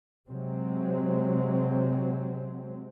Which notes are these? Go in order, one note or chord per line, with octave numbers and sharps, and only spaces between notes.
C3 F#3 G#3 C4